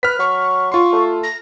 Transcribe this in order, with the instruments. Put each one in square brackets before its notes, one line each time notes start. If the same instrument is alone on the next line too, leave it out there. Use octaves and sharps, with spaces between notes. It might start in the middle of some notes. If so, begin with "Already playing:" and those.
[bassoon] B4 [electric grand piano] F6 B6
[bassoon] F#3 [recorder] C#6
[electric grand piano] F4 C6 [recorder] C#6
[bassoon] A3
[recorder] A#6